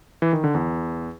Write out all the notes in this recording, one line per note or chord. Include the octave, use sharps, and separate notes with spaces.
E3
D#3
D3
E2